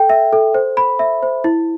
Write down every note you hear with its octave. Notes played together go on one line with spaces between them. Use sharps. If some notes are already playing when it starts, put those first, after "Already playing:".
Already playing: A4 G5
E5
A4
C5
B5
E5
C5
E4